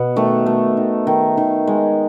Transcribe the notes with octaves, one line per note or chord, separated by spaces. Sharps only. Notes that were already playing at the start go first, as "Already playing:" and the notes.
Already playing: B2 B3
D#3 A3
A3
D#3
D#3
D#3
G#3